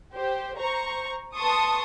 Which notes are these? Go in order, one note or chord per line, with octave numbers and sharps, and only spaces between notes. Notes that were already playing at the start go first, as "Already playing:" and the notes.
G4 C5
C5 A#5 C#6
B4 A5 C6 C#6 D#6